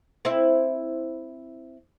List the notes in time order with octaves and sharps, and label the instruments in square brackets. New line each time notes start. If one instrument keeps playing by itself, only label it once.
[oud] C4 E4